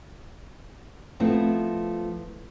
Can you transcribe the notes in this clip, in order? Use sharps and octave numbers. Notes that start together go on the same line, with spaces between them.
F3 A3 B3 C4 E4